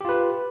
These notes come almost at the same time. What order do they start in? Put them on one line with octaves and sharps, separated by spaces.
G4 F4 B4